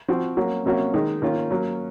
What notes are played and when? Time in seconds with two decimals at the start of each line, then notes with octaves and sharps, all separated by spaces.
0.08 F3 C4 F#4
0.37 F#3 A#3 C#4 F#4
0.65 C3 F#3 A#3 C#4 F#4
0.94 D#3 G#3 D#4
1.22 D#3 A#3 C#4 F4
1.50 F#3 A#3 C#4